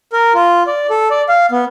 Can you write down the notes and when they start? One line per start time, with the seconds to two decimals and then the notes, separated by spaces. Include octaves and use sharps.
0.13 A#4
0.34 F4
0.67 D5
0.90 A4
1.11 D5
1.29 F5
1.52 B3